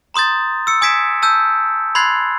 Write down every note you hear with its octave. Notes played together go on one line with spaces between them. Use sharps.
A#5 C6 D#6 G6 A6
E6 C#7
G#5 D#6 G#6 B6 D7 E7
A5 E6 G6
B5 C6 F#6 G#6 A6 C7